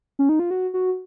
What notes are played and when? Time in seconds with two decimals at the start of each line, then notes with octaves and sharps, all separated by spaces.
0.19 C#4
0.29 D#4
0.39 F4
0.51 F#4
0.74 F#4